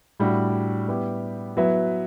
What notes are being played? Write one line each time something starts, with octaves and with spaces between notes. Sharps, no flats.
A2 G3 D4 F#4
G3 B3 E4 G4
F#3 B3 E4 B4 E5